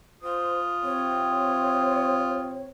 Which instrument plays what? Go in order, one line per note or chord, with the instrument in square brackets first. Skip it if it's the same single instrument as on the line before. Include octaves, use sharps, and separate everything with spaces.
[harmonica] F4 D#6 [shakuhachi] C5
[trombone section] C3 C4 [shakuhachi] C#5